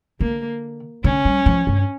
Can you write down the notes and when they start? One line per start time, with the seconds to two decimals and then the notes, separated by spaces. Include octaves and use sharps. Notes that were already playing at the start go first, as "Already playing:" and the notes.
0.20 D3 A#3
1.04 D3 C#4
1.25 G3
1.46 F3
1.67 G2